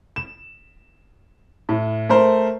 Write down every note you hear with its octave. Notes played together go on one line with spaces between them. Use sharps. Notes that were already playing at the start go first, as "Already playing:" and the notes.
E7
A2
A3 A#4 C5